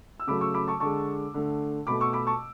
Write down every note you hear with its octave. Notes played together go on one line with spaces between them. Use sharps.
E6
C#3 F#3 A3 B5 D6
C#6 E6
B5 D6
A5 C#6
D3 G#3 A5 C#6
D3 A3
B2 A3 B5 D6
C#6 E6
B5 D6
A5 C#6